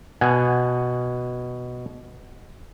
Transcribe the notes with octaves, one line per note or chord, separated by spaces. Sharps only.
B2 F#5 G#5